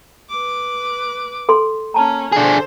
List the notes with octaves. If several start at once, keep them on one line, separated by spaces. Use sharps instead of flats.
B4 D6
A4 C6
A#3 C#4 A5 A#5
D3 D4 G#4 C5